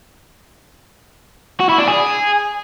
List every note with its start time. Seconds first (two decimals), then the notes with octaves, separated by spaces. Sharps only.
1.60 F#4
1.69 E4
1.78 D4
1.88 G#4